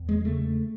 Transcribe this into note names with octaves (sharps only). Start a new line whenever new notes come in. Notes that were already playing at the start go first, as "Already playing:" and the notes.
Already playing: E2
G#3
C#3 A3